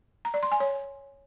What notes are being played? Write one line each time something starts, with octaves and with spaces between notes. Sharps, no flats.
A#5
D5
C6
G#5
C#5